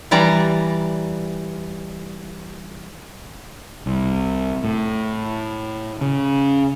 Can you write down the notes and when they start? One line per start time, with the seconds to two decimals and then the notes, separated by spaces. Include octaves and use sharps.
0.11 E3 G3 D5 A#5
3.86 C2
4.64 A2
6.01 C#3